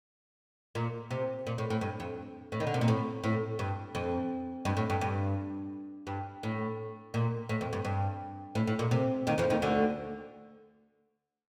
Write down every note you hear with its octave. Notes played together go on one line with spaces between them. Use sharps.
A#2
C3
A#2
A2
A2
G2
F2
A2
D#3
D3
C3
A#2
A2
A2
G2
F2
G2
A2
G2
G2
G2
A2
A#2
A2
F2
G2
G2
A2
A2
A#2
C3
D#2 D#3
F2 F3
D#2 D#3
D2 D3